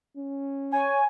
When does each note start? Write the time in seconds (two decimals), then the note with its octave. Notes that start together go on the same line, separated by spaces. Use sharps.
0.17 C#4
0.72 C#5 G#5